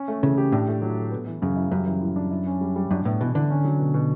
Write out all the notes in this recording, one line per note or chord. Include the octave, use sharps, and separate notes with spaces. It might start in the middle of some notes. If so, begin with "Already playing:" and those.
Already playing: C#4
A3
C#3 E3
G4
A2 D4
A3
F#3
A4
B3
E3
F#2 C#3
E4
F#2 G3
E3
A2
D4
E4
C#4
G3
G3
F#2 D4
A2 B3
B2 E3
D3 E3
C#4
F#3
B2
B2